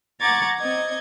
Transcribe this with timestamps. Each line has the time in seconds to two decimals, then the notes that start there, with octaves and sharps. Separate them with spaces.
0.21 F#5 A#5 C#6 D6 G#6 A6
0.60 C4 D#5 G#6